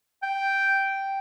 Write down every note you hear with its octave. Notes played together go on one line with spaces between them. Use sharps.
G5